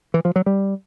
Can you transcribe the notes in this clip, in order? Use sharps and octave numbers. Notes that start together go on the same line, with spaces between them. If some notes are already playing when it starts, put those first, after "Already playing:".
E3
F3
F#3
G3